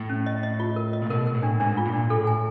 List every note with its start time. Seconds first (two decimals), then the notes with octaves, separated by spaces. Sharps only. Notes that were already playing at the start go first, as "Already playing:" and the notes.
Already playing: A2
0.09 C#4
0.26 D#5
0.43 D#5
0.60 F4
0.76 A#4
0.93 D#5
1.02 A#2
1.10 B2 A#4
1.27 A#4
1.35 A2
1.43 D4
1.60 G#2 D4
1.77 F4
1.85 A#2
1.94 D4
2.10 A2 A4
2.27 G#5